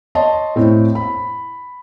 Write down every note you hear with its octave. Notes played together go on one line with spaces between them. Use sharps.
C#5 D#5 A5 C6
A2 C4 C#5
B5